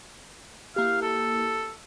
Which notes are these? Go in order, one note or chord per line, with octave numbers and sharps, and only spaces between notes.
A#3 E4 G4 F5
A4